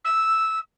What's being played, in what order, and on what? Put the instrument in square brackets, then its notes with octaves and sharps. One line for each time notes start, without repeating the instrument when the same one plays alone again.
[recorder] E6